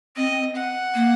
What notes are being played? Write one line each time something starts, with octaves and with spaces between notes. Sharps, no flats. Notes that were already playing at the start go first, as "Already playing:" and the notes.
C4 D#5
F#5
A#3